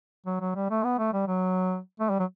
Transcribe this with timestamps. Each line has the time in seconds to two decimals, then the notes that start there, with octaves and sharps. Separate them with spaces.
0.26 F#3
0.41 F#3
0.55 G3
0.70 A3
0.84 B3
0.99 A3
1.13 G3
1.27 F#3
2.00 A3
2.10 G3
2.19 F#3